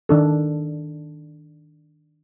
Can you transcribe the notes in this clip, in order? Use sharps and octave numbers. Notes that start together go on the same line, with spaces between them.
D#3 D4 A4